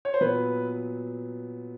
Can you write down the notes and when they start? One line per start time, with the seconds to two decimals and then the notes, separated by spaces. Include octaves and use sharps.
0.05 C#5
0.14 C5
0.21 A#2 F#3 B3 B4